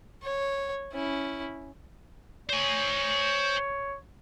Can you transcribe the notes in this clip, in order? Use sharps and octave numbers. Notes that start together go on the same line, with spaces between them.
C#5
C#4 E4
C5 C#5 G#5